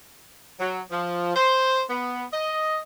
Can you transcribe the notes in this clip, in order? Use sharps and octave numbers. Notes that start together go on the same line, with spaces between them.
F#3
F3
C5
B3
D#5